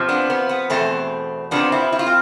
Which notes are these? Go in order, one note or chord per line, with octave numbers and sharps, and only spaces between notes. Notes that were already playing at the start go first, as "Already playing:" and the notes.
Already playing: F2 C3 F3
B3 D4
B3
B3
E2 B2 A3 C4
F2 C3 F3 B3 D4
C4 E4
E4
F4
C4